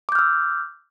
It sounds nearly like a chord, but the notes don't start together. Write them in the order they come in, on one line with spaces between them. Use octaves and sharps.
D6 G6 F6 E6